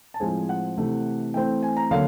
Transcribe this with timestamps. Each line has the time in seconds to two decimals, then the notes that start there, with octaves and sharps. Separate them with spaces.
0.14 A5
0.20 A2 F3 G#3 C4 G#5
0.49 F#5
0.77 C3 E3 A3
1.34 E3 A3 C4 G5
1.63 G#5
1.77 A#5
1.91 D3 F#3 A#3 F5